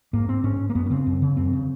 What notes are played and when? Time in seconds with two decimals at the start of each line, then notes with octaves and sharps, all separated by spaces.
0.13 G#2 A#3
0.29 C4
0.44 G#2 C#4
0.69 A#3
0.75 F#2 B3
0.86 C#4
0.90 C#3 C4
1.07 F#2
1.22 C#3
1.37 F#2 C4
1.53 C#3